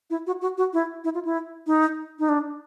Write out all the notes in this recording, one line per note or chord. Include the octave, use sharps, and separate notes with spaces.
E4
F#4
F#4
F#4
E4
E4
F4
E4
D#4
D#4
D4